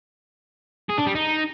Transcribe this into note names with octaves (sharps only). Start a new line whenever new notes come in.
G#4
D4
G3
D#4